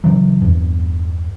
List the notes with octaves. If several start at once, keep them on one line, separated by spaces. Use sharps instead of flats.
C#3 E3 F#3
E2 G2